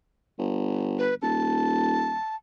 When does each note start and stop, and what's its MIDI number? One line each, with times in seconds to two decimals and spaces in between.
0.39 1.14 31
0.98 1.15 71
1.22 2.18 27
1.22 2.36 81